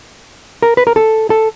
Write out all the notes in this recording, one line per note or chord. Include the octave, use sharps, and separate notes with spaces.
A#4
B4
A#4
A4
A4